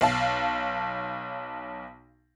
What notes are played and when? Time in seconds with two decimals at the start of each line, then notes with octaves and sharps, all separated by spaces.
0.01 B1 F5 A5